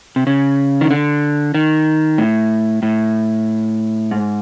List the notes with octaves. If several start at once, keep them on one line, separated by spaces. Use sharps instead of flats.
C3
C#3
D#3
D3
D#3
A2
A2
G#2